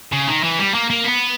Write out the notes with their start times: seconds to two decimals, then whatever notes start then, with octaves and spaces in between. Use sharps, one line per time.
0.12 C#3
0.27 D#3
0.43 E3
0.59 G3
0.74 A#3
0.90 A#3
1.05 B3